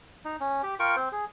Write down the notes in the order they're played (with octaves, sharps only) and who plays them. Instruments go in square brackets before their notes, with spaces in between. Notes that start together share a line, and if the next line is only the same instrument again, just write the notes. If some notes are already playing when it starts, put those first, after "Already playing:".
[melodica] D#4
C#4
G4
F4 A#4 G5 C#6
C4 C5
G#4